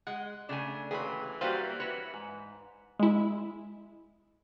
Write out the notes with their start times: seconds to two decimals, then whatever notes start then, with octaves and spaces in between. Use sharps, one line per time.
0.07 G#3 F#5
0.49 C#3 A3 D4 G#5
0.91 D#2 C3 E3 F#3 G#4 B5
1.41 G3 A#3 F#4 B4 C5 F5
1.80 F#4 B4 C#5
2.14 G#2
2.99 G#3 E4